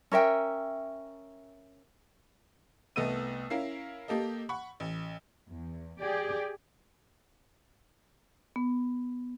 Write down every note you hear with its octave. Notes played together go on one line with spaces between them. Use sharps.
C#4 A#4 E5 G5
C2 A3 B3 D#5 E6 D#7
C#4 E4 A#4 F5 C7
A#3 G4 A4 D#5
F#5 B5 C#6
A1
E2
G4 G#4 D5
B3